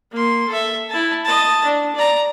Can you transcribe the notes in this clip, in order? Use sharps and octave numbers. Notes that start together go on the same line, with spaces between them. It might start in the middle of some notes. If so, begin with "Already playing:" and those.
A#3 C6
A4 E5
E4 A5
D#5 A5
D4
D5 A#5